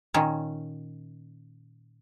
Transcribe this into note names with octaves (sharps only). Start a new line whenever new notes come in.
A#2 D#3 C#4